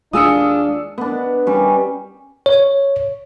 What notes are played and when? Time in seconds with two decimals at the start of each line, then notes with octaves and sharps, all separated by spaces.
0.13 D#2 G#3 D4 F4 G#4 D#6 E6 C#7
0.98 B3 D4
1.47 G3 C#4
2.46 C#5